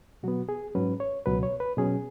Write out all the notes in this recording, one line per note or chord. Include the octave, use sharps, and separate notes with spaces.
B2 F#3 B3 F#4
G#4
G#2 F#3 C#4 B4
C#5
C#2 B2 F#3 B4
C#5
B4
B2 F#3 C#4 G#4